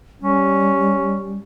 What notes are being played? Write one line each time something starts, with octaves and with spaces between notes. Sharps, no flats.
G3 C#4